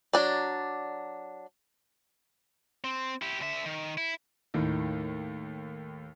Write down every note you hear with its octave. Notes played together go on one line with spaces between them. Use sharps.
F#3 D4 D5
C4
E4 G4
D3 E5
D#3
E4
D#2 A2 D#3